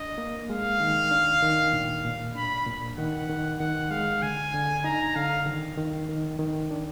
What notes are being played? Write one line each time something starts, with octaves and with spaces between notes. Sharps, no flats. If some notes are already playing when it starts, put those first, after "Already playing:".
Already playing: D4 D#5
A#3
G#3 F5
D#3
D4
D#3
A#2
A#2
D4 B5
A#2
D#3 F#5
D#3
D#3 F#5
G#3 F5
D3 G#5
D3
D#4 A#5
D3 F5
D#3
D#3
D#3
D#3
D4